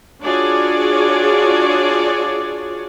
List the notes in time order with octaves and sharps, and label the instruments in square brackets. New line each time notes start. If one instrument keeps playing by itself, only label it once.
[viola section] D4 F4 F#4 G#4 C#5 D5